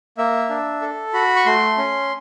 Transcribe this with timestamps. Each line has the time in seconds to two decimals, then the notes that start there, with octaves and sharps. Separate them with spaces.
0.18 A#3 E5
0.49 D4
0.82 A4
1.13 F#4 B5
1.36 C#6
1.46 A3 C6
1.78 C#4